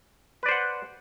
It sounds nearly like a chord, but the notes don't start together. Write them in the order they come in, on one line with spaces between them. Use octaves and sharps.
B4 D5 C5 F#5